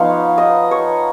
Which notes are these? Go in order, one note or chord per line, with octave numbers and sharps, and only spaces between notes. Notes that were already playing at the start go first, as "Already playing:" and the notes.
Already playing: F3 B3 D#4 C#5 F5
D#5
C#5